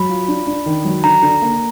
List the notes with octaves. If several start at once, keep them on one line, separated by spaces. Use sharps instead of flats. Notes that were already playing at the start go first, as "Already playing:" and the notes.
Already playing: F#3 B5
F4
D4
D4
D#3
F#3
D3 A#5
D3
A#3